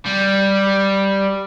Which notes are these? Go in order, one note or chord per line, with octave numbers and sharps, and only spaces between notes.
G3